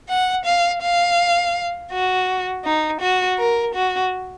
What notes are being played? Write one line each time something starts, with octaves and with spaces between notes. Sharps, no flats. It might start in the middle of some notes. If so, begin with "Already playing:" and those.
F#5
F5
F5
F#4
D#4
F#4
A#4
F#4